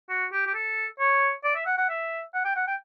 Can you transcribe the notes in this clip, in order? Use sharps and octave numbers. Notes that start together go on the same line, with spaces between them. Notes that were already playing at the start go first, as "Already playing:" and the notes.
F#4
G4
G4
A4
C#5
D5
E5
F#5
F#5
E5
F#5
G5
F#5
G5